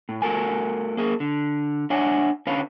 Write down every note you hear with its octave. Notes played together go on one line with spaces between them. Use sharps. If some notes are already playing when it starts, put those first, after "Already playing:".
A2
A3 F#4 A4 A#4 G#5
A#3 G#4 A#4
D3
D4 C#5 E5 F#5 G#5
D3 C#4 B4 C#5 F5